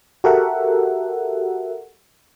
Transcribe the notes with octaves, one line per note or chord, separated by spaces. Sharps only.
F#4 G4 A4 A#4 E5 F#5